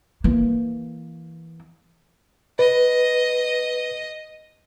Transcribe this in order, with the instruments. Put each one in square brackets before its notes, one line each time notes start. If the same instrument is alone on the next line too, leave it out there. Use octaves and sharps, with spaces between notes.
[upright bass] E3 A#3
[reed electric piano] B4 [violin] D#5